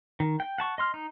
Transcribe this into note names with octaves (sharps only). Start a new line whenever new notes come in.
D#3
G5
F#5 A5 C#6
D#5 C6 F6
D#4